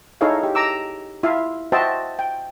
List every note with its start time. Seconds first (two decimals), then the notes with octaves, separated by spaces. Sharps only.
0.21 D#4 E4 G#4 A4 C#5 F5
0.43 G4
0.55 A#5 D6 E6
1.23 E4 F4 E5 F5
1.72 F#4 C5 D#5 E5 G5 A5
2.19 G5